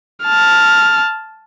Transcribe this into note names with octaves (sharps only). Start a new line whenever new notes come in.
A5 F6